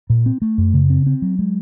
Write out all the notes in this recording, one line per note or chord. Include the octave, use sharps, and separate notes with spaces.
A#2
C4
A3
F#2
C#3
C4
C4
F#3
G#3